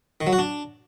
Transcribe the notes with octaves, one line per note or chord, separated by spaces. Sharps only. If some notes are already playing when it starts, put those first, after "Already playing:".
D#3
F#3
F#4
D4